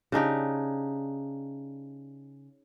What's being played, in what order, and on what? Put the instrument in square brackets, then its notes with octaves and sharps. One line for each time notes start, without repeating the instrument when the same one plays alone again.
[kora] C#3 D4 D#4 G4